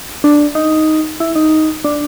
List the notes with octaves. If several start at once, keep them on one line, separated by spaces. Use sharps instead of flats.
D4
D#4
E4
D#4
D4